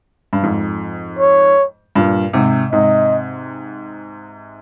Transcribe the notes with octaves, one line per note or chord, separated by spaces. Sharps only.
G2
F2 G#2
C#5
G2 A#2
G#2 C3
G#2 C3 D#5